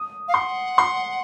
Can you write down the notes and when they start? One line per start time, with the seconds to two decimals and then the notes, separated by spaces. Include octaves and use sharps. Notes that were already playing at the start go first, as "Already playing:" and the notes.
Already playing: D#6
0.28 F5
0.34 F#5 C6
0.78 C6